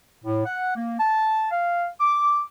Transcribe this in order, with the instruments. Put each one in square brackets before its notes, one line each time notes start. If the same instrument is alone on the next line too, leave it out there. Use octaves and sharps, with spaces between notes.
[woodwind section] A2
F#5
A#3
A5
F5
D6